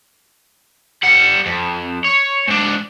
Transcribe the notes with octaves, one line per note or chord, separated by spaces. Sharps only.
G3 F#5
F2
C#5
G#2 D4